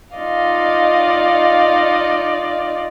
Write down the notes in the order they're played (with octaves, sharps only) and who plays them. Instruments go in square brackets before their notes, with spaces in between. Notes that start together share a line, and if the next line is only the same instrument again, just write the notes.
[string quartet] D#4 F4 D5 D#5 F5